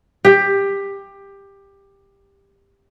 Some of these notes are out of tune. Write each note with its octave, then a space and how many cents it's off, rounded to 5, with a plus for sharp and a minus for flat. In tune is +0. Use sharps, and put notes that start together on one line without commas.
G4 +15